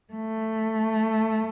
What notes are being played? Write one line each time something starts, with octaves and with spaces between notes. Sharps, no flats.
A3